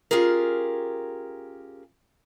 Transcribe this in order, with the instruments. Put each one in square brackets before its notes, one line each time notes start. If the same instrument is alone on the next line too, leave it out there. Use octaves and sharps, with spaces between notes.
[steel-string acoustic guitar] C#4 F4 G4 G#4 A#4